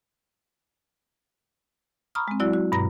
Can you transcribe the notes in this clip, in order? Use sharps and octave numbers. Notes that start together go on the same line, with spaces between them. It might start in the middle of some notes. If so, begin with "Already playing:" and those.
A#5 B5 C#6 D#6 F6
G#3 C4
F#3 E4 F#4 D5
F#4
G2 B2 A#5 A#6